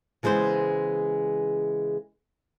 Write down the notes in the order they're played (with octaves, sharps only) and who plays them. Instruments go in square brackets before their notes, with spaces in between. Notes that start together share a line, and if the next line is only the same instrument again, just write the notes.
[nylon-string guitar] C#3 E3 G#3 B3 C5